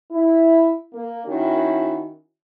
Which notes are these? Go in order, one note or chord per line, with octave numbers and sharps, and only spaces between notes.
E4
A#3
D#3 C#4 E4 F#4